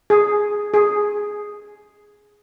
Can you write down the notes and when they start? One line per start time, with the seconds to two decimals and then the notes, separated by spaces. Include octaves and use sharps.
0.10 G#4
0.74 G#4